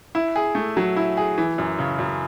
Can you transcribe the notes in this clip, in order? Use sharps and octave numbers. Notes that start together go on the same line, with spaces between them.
E4
G#4
A3
F#3
E4
G#4
E3
F#2
C#3
F#2